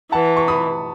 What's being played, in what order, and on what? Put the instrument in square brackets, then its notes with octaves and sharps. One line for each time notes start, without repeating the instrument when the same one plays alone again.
[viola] E3 [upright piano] F#5 A5
[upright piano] C#6
B5 D#6